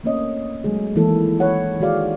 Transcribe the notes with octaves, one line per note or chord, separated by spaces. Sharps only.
A3 A#3 C4 C#4 C#5 D#5
F#3 G#3 A3 G#4
D#3 E3 G#3 A#3 E4 A4
B4 C#5 F#5
D#3 G#3 F#4 G#4 D5 F5